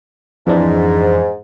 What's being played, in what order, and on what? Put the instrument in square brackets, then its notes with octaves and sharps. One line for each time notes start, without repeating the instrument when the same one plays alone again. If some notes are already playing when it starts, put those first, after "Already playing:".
[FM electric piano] F2 E3 D4 [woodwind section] G#2